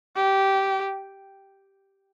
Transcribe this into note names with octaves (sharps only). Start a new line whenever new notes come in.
G4